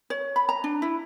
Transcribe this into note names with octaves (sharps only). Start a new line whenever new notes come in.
C#5
B5
A#5
D4
E4